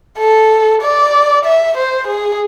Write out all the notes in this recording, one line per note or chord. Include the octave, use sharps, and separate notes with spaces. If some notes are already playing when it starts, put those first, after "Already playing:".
A4
D5
E5
C5
G#4